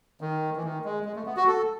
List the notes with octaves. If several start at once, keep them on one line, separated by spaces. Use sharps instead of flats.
D#3
E3
D#3
G#3
G#3
A3
B3
F#4
A4